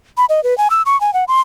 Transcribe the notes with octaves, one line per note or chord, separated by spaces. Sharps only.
B5
D#5
B4
G#5
E6
C#6
G#5
F#5
C6